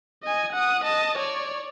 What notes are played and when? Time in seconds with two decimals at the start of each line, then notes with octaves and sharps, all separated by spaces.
0.23 D#5 G#5
0.52 F#5 D#6
0.84 D#5 A5
1.18 C#5 D5